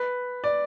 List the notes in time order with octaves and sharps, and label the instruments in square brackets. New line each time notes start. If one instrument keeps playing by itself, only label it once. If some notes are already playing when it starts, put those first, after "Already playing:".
Already playing: [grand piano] B4
D5